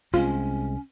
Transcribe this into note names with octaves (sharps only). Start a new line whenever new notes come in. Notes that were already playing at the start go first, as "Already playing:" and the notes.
C2 G#3 C4 C#4 F4